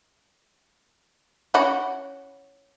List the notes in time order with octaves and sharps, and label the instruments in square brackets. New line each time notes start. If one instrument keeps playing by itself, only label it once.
[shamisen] C#4 E4 F#4